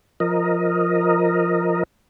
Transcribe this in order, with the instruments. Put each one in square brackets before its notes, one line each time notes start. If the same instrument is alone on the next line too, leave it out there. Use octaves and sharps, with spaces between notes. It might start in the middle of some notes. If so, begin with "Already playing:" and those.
[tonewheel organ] F3 A#4 D#5